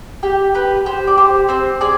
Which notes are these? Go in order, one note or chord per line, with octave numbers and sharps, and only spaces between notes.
G4
G4 B4
G4 C5
D5
G4 C5
C4 C5
G#4 D5